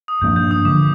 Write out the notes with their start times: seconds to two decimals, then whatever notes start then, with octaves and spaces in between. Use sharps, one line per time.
0.08 D#6
0.22 G2 F3 A#3 D4 G6
0.36 G6
0.51 D#6
0.65 D3 F3 D6